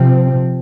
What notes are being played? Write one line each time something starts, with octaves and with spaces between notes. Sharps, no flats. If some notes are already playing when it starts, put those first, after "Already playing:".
Already playing: C3 F3 C4